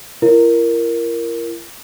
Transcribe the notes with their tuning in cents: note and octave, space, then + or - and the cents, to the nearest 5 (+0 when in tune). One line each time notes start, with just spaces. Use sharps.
E4 +45 A#4 +0